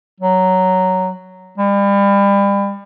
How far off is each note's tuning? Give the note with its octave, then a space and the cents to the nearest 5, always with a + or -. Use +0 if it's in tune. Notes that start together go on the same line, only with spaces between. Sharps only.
F#3 +5
G3 +35